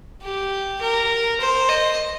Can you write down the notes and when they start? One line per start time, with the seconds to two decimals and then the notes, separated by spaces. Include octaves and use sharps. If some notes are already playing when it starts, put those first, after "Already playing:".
0.23 G4
0.81 A#4
1.40 C5
1.69 D#5